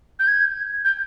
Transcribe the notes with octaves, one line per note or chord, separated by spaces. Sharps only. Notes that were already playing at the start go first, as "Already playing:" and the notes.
G6
G#6
G6